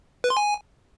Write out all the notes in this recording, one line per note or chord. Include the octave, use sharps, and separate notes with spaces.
B4
C6
G#5